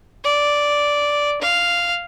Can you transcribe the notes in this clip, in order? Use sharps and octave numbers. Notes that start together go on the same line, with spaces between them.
D5
F5